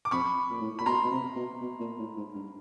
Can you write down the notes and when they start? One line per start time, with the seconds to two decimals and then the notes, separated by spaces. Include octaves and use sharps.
0.05 D6
0.11 F2 B5 C#6
0.50 A#2
0.61 A2
0.79 A#2 B5
0.86 B2 A#5 C6
1.04 B2
1.11 C3
1.36 B2
1.61 B2
1.80 A#2
1.99 A2
2.17 G#2
2.35 G2